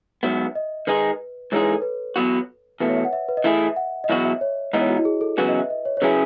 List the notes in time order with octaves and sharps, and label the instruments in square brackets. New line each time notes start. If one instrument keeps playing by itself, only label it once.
[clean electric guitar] G#2 F#3 B3 [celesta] E5
[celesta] D#5
[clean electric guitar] D#3 G#3 D#4 G#4 [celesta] B4
[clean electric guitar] G#2 E3 G#3 D#4 G#4 [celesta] C#5
[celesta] B4
A4
B4
[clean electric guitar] E2 B2 F#3 B3 F#4
[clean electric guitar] E2 B2 A3 [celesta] B4
[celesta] C#5
E5
F#5
E5
B4
D#5
[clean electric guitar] E3 A3 E4 G#4 [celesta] E5
[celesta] E5
F#5
D#5
[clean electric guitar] E2 B2 F#3 B3 F#4 [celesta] E5
[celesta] E5
C#5
[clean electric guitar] G#2 E3 B3 D#4 [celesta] D#5
[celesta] C#5
F#4
E4
G#4
A4
[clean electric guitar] E2 C#3 F#3 C#4 F#4 [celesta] B4
[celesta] D#5
E5
D#5
C#5
C#5
[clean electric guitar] C#3 F#3 C#4 E4 G#4 [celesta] B4